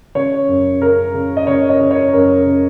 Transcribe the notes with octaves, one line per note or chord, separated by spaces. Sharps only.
C#3 C#5
F#2
C#3 A#4
C#3
D#5
C#3 C#5
D#5
C#3
C#5
F#2 A#4
C#3